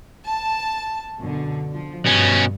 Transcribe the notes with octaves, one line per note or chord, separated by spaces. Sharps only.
A5
F#2 B2 D3
F3
G2 B2 C#4